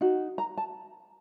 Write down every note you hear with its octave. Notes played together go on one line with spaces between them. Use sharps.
D#4 F#4
A#5
A5